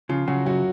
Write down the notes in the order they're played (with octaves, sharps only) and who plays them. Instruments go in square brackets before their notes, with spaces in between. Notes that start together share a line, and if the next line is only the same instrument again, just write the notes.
[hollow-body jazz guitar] C#3 [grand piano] F3 F4
[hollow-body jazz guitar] C#3 [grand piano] F#3 F#4
[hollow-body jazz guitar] F#2 [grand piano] F#3 F#4